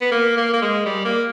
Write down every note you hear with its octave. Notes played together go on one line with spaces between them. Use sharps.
B3
A#3
A#3
A#3
G#3
G3
A#3